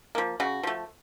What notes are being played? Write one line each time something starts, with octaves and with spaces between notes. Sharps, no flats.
F3 A#3
C#3 F#4
F3 A3